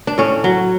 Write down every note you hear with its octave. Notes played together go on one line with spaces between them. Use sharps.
D4
A2 C#4
F#3